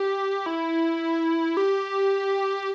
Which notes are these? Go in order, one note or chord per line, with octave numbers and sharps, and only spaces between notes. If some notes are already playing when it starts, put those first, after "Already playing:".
Already playing: G4
E4
G4